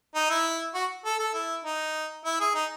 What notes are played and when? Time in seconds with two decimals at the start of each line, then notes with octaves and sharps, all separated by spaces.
0.15 D#4
0.30 E4
0.74 F#4
1.05 A4
1.19 A4
1.34 E4
1.65 D#4
2.25 E4
2.40 G#4
2.55 D#4